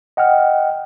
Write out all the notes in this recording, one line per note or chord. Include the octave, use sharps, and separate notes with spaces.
D#5 F#5 G5 F6